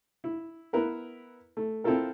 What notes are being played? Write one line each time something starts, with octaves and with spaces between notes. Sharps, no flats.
E4
B3 E4 A#4 B4
A3
C4 E4 F4 A4 A#4